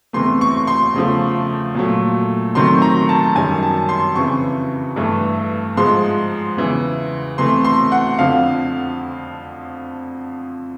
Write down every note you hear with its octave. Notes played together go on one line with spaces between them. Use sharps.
E2 C3 E3 A3 C6
C#6
C6
E2 C#3 F3 A3
A#2 F#3 A3
C3 D#3 F#3 A3 C6
A#5
A5
F#2 D#3 G3 G#5
A5
C6
F2 C#3 E3 C#6
G2 E3 A3
G#2 F3 G#3 C6
E2 C#3 E3
C3 E3 A3 C6
C6
F#5
F2 D3 F3 F5